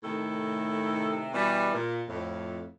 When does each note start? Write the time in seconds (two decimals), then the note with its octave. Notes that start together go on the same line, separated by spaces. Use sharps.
0.03 A2 C3 D#3 A4
1.34 B2 E3 G3
1.73 A#2
2.08 F2 A2